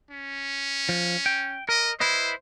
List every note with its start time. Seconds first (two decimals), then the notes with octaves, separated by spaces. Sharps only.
0.11 C#4
0.89 F3
1.26 G5
1.69 A#4 D#5
2.00 E4 B4 C5 D#5